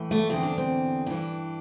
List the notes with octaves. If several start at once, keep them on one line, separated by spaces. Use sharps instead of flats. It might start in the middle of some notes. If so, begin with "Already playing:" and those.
Already playing: A2 E3
A3
E2 D3 C4
D4
C4
G2 E3 D4